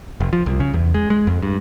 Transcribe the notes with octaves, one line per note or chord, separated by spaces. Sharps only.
F1
F3
C2
C#3
E2
G#3
G#3
F2
G2